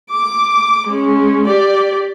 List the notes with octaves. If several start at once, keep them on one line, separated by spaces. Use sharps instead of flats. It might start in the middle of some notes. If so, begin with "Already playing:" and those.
D6
G#3 C#4
G4 D5